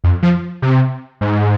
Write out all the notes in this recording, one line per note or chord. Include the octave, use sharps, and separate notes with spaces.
F2
F3
C3
G#2